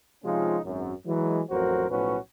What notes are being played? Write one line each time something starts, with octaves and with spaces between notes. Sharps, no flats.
C3 F3 G#3 C#4 D#4 F4
G#1 F#2
E3 F#3 G#3
A1 F2 F#3 F#4 A#4 C5
B1 A2 F3 C#4 F#4 B4